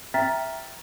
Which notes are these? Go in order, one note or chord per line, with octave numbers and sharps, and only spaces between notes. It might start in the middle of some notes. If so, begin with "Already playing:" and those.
E5 G5 A#5 F6 A6 B6